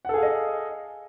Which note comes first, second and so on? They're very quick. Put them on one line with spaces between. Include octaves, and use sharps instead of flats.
F#5 A4 G#4 F5 D#5